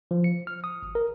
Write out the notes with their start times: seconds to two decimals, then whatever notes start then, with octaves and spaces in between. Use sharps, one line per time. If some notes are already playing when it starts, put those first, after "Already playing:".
0.11 F3
0.24 C#7
0.47 F6
0.64 D#6
0.83 G#1
0.95 A#4